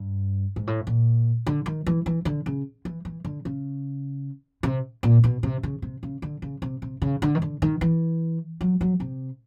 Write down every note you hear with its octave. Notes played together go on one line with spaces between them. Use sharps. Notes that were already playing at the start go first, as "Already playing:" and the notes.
Already playing: G2
G#2
A2
A#2
D3
D#3
E3
E3
D3
C#3
E3
E3
D3
C#3
C3
A#2
B2
C3
C#3
C3
C#3
D3
C#3
C3
C3
C#3
D3
D#3
D3
D#3
E3
F#3
F#3
C3